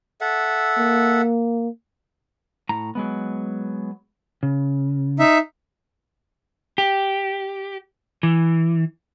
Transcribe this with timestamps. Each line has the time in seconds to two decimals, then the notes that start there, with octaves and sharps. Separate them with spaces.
0.21 A4 E5 F#5
0.78 A#3
2.69 A2 A#5
2.95 F#3 G#3 B3
4.43 C#3
5.19 D#4 E5
6.78 G4
8.23 E3